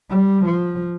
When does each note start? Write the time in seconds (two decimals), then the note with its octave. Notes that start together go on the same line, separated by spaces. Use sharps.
0.10 G3
0.45 F3